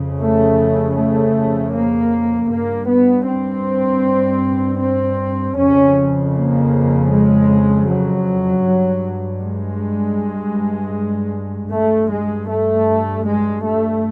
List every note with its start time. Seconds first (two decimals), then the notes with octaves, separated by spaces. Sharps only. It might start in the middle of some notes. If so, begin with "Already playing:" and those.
Already playing: F2 C#3
0.19 A3
0.96 A3
1.74 A#3
2.50 G2 A#3
2.88 B3
3.27 C4
4.80 C4
5.57 F2 C#3 C#4
6.34 A#3
7.11 G#3
7.87 F#3
8.64 G2
9.41 G#3
11.71 G2 A3
12.10 G#3
12.49 A3
13.26 G#3
13.64 A3